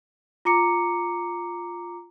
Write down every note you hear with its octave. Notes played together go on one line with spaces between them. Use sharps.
F4 A#5 D6 C#7